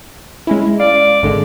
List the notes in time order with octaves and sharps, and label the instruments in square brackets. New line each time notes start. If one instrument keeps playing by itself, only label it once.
[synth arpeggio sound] G#3 C#4 E4
[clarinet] D5 [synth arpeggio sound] F5
[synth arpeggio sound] G#1 D3 G#3